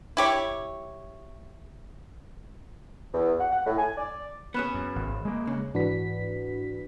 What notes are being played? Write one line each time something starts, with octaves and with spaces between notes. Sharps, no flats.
E4 G4 C#5
E2
F#5
F#5
A2
G#5
D5
B3 C#4 G#4 B5 F#6 E7
F#2
G#1
G#3 A#3
C#3
G#2 E3 D4 F#4 B4 B6